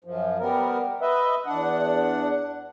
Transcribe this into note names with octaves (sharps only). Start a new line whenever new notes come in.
F#2 F3
G3 B3 A#4
B4 D#5 E5
E2 D4 F#5